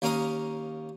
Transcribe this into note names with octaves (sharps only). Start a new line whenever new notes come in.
D#2 A#3 C#4 F5 A#5 D#6